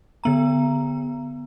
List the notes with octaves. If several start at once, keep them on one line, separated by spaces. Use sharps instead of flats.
D3 B3 A#5